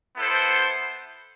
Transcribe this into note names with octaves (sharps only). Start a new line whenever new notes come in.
B3 E4 A4 C5